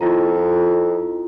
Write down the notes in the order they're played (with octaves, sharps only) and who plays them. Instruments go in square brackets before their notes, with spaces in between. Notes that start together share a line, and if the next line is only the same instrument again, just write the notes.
[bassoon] F2 [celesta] E4 F4 A#5